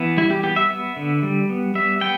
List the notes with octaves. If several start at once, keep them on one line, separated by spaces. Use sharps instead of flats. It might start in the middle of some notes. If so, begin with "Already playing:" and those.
Already playing: E3 B3
G3 E4
G4
B3 G4
E5
B3
D3
G3
B3
G3 E5
B3 G5